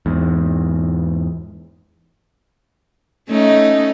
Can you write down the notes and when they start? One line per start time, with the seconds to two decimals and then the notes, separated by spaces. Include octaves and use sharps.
0.06 E2 G#2
3.29 A3 C#4 D#4